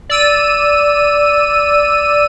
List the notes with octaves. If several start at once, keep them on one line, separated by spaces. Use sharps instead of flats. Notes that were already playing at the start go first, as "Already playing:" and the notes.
D5 E6 D#7